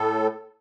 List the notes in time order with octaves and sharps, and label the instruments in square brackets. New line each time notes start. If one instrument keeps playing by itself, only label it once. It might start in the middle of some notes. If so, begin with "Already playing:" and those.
Already playing: [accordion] A2 A4